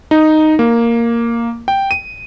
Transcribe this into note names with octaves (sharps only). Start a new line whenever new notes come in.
D#4
A#3
G5
D#7